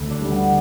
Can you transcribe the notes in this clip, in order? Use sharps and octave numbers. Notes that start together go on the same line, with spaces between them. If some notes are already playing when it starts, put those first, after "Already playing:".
Already playing: D2 E4
D4
D3 G3
B3